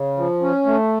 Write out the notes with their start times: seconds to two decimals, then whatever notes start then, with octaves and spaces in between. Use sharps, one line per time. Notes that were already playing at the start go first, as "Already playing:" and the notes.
Already playing: C#3
0.17 F3
0.42 C#4
0.66 A3